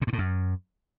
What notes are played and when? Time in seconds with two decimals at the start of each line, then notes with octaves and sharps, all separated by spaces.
0.02 A#2
0.07 G2
0.13 A2
0.18 F#2